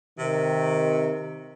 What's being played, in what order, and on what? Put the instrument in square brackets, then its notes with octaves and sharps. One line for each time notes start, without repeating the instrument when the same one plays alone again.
[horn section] C3 D#3